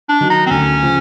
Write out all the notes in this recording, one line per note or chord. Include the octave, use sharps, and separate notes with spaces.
D4
D#3 F#3
D#4
C4
D2 C#4
C#3 F3